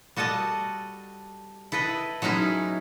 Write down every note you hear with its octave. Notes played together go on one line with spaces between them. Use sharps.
G3 F#4 A4 D#5 A5
E4 A4 B4 D#5
F#3 G#3 C#4 D#4 E4